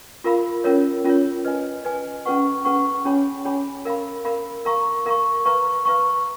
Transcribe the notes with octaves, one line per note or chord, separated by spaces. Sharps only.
F4 A#4 F5 B5
C#4 F4 A#4 C#5
C#4 F4 A#4 C#5
B4 D#5 G#5
B4 D#5 G#5
C#4 G#4 B4 F#5 C#6
C#4 G#4 B4 F#5 C#6
C#4 G#4 C#5 G#5 B5
C#4 G#4 C#5 G#5 B5
A#4 F5 B5
A#4 F5 B5
A#4 F5 A#5 C#6
A#4 F5 A#5 C#6
B4 F5 A#5 C#6
B4 F5 A#5 C#6